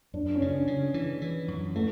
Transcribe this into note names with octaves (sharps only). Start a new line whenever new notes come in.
F#2 D4
C#4
C#3 D4
C#3
E3
E3
F#2
E3 A3